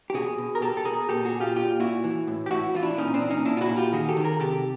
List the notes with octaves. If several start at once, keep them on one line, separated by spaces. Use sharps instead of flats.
G4
B2 F#4 G#4
B2
A#4
B2 G4 A4
A4
B2 G#4 A#4
A#2 G4 A4
F#4 G#4
A#2
F4 G4
A#2 F4 G4
A#2 E4 F#4
E3
A2
G4
A2 E4 F#4
E3 F4
D4 E4
A#2 C#4 D#4
C4 D4
A#2
C#4 D#4
A#2 D4 E4
F4
E4 F#4
A#2
F4 G4
D#3 F#4 G#4
G4 A4
D#3
G#4 A#4
C3 G4 A4